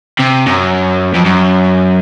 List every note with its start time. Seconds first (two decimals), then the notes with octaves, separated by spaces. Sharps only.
0.20 C3
0.46 F#2
1.15 F2
1.26 F#2